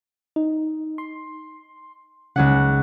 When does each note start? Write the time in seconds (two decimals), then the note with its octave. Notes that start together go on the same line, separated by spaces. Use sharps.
0.36 D#4
0.98 C6
2.36 C#2 C#3 C#4 F#5